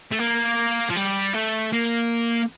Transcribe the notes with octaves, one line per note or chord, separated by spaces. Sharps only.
A3
A#3
F3
G3
A3
A#3